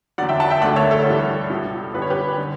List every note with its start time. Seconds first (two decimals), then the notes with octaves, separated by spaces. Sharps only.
0.18 E2 D3 F#3 D5 F#5
0.29 E5 G5
0.40 F#5 A5
0.51 E5 G5
0.62 D2 D5 F#5
0.65 D3 A3
0.76 C#5 E5
0.91 A4 C#5
1.06 G2 E3 G3
1.50 C#2 B2 G3
1.94 F#2 D3 G3 B4
2.02 C#5
2.10 G4 B4
2.38 D3 G3